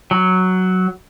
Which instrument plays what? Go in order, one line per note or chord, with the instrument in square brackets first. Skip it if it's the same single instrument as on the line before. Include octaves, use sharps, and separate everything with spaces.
[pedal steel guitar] F#3